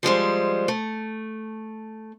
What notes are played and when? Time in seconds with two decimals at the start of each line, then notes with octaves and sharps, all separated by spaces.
0.03 F3 G3 G#3 C5
0.68 A3